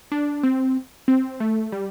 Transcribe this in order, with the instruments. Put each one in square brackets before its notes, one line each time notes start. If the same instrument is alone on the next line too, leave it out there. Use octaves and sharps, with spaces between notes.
[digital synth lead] D4
C4
C4
A3
G3